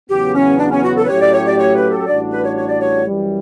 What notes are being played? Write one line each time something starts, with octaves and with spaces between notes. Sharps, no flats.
E2 C#3 F#3 B3 G4
C#4
D4
C#4
F#4
A4
B4
A2 F#3 A3 C#4 G4 C#5
D5
C#5
D5
C#5
B4
A4
A1 A2 G3 D4 F#4 D5
B4
C#5
C#5
D5
C#5
F#2 E3 G3